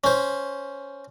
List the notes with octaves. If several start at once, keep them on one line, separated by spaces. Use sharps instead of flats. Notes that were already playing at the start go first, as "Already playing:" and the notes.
C#4 C5